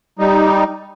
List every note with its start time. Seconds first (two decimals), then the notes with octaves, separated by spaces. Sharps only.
0.19 G3 D#4